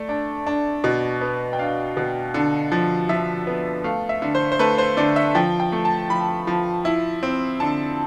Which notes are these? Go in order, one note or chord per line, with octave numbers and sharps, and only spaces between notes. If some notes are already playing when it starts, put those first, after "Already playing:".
Already playing: A3 D5
D4
D4
B2
B3
G5
D4 F5
B2
D3
F3
F3 E5
B3
A3 F5
E5
D3
C5
C5
A3 B4
C5
D3 D5
E5
F3 G5
G5
A3
A5
F3 B5
F3
E4
C4
D3 A5